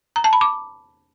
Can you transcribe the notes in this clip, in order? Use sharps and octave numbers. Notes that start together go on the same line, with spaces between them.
A#5
A5
B5
D6